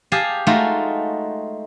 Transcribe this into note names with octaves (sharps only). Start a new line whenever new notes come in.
G4 G#4 F5 G#5 A5
G#3 A3 D#4 F4 F#4